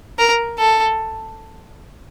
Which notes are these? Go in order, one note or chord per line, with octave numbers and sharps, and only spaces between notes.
A#4
A4